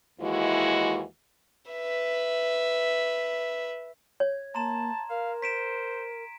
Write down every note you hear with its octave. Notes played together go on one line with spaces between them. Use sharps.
D#2 E3 G#3 E4 F#4
B4 E5
C#5 G#6
A#3 A5 A#5 C6 E7
A#4 F5
C5 B6 D7 E7